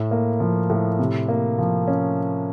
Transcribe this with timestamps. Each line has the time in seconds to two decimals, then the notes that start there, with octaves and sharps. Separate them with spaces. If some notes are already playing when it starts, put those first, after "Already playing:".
Already playing: A2
0.11 A#3
0.40 F3
0.70 A2
0.99 C3
1.28 A#3
1.59 F3
1.87 C#4